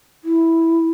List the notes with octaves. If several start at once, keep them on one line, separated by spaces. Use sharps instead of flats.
E4